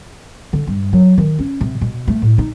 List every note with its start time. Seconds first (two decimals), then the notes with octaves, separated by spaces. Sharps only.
0.53 D3
0.67 G2
0.93 F#3
1.18 D#3
1.39 C#4
1.61 C3
1.81 B2
2.08 A3
2.22 A2
2.38 D#4